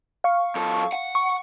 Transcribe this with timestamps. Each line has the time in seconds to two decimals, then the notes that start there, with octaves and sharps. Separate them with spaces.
0.24 F5 C#6
0.55 F#2 A4
0.93 F#5
1.15 C#6